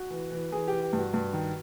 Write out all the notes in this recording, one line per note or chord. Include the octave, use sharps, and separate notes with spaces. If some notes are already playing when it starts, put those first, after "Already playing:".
Already playing: F#4
E3
E3
E3 G#4
E3 G4
G4
G2
F#4
G2
D#3